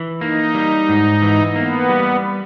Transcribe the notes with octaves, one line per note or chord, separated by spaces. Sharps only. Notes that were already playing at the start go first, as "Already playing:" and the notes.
Already playing: E3
A#3 D#4
G3
G#2
E3
A#3 B3
G3